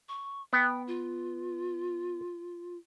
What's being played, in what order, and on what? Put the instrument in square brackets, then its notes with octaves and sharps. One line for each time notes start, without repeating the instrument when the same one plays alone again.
[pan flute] C#6
[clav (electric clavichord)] B3 [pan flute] G5
[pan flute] F4